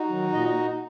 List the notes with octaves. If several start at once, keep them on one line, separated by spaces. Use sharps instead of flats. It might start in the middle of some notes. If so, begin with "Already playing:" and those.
Already playing: D#4 F#4
D#3 F#3
A#2 D#5